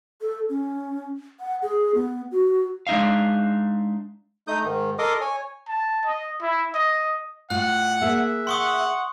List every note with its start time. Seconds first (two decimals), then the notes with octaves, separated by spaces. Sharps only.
0.21 A4
0.49 C#4
1.40 F#5
1.62 G#4
1.95 B3
2.32 F#4
2.87 G#3 D4 D#4 E5 F5
4.48 A3 D#4 D#6 G6
4.64 G#2 D#3
4.99 A4 A#4 D#5 C6 D6 D#6
5.21 C#5 G#5
5.68 A5
6.05 D#5
6.42 E4
6.74 D#5
7.50 A2 F4 F#5 F#6
8.01 A#3 G#4 E5
8.47 F#5 C6 C#6 D#6